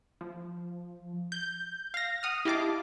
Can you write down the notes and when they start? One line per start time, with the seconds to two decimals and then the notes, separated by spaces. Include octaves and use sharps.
0.21 F3
1.32 G6
1.94 F5 A#6
2.23 F#5 D#6 F6
2.45 E4 G4 D#5 F5 A5 D6